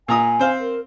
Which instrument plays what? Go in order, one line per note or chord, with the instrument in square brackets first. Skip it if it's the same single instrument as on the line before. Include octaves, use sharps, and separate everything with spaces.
[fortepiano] A#2 A#5 D#6 [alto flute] G#5
[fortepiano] C4 C5 F5
[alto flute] A#4